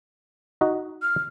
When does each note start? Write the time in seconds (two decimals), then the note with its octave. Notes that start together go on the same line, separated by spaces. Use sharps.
0.61 D#4 F#4 D#5
1.02 F6